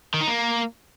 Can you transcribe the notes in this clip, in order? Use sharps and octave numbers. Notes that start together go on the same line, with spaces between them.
D#3
D#4
A#3